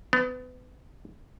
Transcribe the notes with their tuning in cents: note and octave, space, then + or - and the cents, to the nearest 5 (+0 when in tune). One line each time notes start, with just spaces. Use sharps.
B3 +30